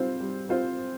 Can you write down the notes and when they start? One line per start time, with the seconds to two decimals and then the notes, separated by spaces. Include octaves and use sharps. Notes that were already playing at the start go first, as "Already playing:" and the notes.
Already playing: G3 C4 F4 C5
0.20 G3
0.49 C4 F4 C5